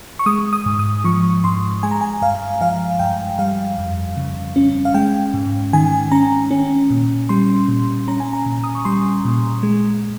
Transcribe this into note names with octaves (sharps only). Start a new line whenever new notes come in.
C#6
G#3 D#6
D#6
G#2
D#6
F3 C#6
G#2 C6
G#3 G#5
A#5
G#5
G2 F5
F3 F5
G2 G5
G3 F5
F2
C#3
C#4
F5
G#3 G5
G#2
D#3 G#5
C#4 A#5
C#4
A#2
G3 C6
A#2
C#4 A#5
G#5
A#5
A#2
D#6
C#6
G3 C6
A#2
G#3